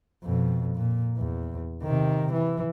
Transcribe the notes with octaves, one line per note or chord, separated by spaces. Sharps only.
F2 B2
A#2
E2
C3 D#3
E3